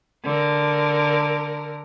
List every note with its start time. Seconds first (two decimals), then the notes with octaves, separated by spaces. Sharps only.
0.24 D3 A#4